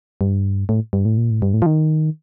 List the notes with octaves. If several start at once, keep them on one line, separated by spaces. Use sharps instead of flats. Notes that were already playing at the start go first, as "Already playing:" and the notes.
G2
A2
G2
A2
A#2
A2
G2
A2
F3
D#3